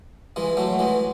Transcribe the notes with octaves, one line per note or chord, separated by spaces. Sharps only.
E3 G#3
F#3 A3
E3 G#3